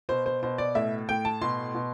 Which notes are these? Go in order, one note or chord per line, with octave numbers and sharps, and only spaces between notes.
B2 C5
C5
B2 C5
D5
A2 E5
A2 G5
A5
B2 C6
B2